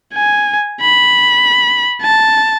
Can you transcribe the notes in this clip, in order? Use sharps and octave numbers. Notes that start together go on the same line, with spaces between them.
G#5
B5
A5